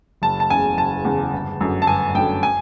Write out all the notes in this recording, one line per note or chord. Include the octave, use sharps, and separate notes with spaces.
F#1 A5
A5
E2 C#3 G#5
F#1 A5
E2 C#3
G1
F#2 D3
A5
G1 G#5
F#2 D3 G5
G#5